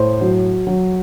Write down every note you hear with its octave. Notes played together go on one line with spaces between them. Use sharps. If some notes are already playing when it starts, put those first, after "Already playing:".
Already playing: A2 C5
F#3
F#3